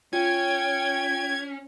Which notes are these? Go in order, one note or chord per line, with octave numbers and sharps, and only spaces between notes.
C#4 F4 G5 G#6